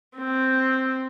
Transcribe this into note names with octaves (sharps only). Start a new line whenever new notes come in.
C4